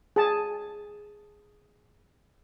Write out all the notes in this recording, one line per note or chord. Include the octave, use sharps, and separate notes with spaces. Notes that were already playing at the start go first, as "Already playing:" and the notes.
G#4 A5